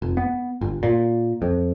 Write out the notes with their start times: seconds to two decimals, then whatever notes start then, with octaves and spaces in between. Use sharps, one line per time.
0.02 F1
0.17 B3
0.61 G1
0.83 A#2
1.42 F2